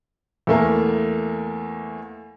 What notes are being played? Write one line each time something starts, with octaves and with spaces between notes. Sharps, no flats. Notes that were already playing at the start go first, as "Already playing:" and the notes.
E2 A3 A#3